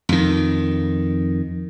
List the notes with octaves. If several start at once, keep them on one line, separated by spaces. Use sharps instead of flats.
F2 D#3